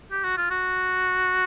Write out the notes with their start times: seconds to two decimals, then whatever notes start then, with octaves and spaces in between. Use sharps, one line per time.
0.11 G4
0.24 F#4
0.37 F4
0.50 F#4